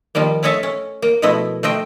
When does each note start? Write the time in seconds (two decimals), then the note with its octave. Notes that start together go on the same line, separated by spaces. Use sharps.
0.15 D#3 F3 G3 A#3
0.43 A3 C#4 C#5 D#5 E5 A5
0.63 C#4
1.02 A#3
1.22 B2 F3 A3 E4 D#5
1.63 A3 C5 D#5 G5